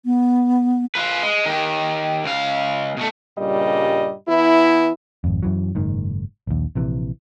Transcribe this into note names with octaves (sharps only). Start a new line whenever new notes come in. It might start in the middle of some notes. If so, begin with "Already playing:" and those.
B3
F4 B4
G#3
D#3 G4
C#2 F5
B2 A3
G2 A#2 C#3 G3 D#5
E3 B3 E4
G#1 F2
F#2 E3 F#3
F#1 G#2 D#3
A#1 D#2
A#1 C3 E3